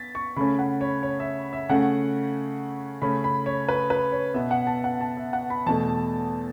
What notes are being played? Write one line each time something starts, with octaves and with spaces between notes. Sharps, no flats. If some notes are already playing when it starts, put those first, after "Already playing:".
Already playing: B3 A6 B6
C#6
C#3 A3 C#4 B5
F#5
C#5
C#5
E5
E5
C#3 A3 C#4 F#5
C#3 A3 C#4 B5
B5
C#5
B4
B4
C#5
B2 B3 E5
F#5
A5
F#5
A5
E5
F#5
B5
E2 B2 A3 A5